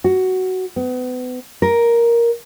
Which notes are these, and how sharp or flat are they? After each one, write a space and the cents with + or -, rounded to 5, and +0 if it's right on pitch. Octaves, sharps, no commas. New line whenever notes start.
F#4 +10
B3 +35
A#4 +5